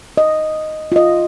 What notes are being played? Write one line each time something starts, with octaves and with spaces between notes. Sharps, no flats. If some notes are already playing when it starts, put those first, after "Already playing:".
D#5
F4 D#5